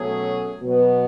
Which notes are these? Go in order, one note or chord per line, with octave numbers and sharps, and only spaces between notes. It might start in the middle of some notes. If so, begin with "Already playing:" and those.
Already playing: B2 F#3 A3 C#4 G#4
B2 F#3 B3